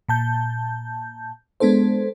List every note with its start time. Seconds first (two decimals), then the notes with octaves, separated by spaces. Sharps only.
0.09 A#2 A5 G6
1.60 G#3 B3 D4 A4 C5